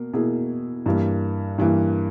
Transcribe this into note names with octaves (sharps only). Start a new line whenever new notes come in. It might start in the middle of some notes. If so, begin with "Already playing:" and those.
Already playing: B2 A#3
B2 A#3 E4 G#4
G2 E3 A#3
G2 E3 A#3